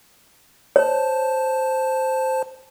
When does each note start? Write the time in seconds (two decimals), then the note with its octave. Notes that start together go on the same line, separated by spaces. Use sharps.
0.76 C5 C#5 A5